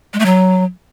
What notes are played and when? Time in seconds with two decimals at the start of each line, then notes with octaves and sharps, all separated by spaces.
0.13 G#3
0.20 A3
0.26 F#3